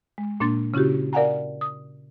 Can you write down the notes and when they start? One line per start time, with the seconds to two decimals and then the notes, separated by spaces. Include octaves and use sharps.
0.18 G#3
0.40 A#2 A#3 D4 C6 A6
0.74 C#3 C#4 E4 F#4 G4
1.13 A#4 D5 F5 F#5 G#5 A#5
1.61 D#6